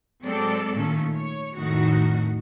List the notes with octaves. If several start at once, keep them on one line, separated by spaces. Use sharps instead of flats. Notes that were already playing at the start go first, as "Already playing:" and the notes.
F#3 G#3 C4 A4 D5
A#2 D#3 A3 C#4 A4
C#5
F2 A2 D#3 D#4 F#4